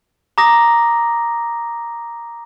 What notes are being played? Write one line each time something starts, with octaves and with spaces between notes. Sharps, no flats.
A#5 D6 D#6 A#6